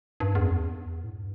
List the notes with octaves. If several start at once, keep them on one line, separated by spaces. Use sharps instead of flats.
G2
E2
F#2
E2
A2
G2